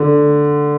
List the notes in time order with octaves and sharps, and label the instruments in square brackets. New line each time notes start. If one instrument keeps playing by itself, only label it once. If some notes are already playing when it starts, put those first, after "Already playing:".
Already playing: [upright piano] D3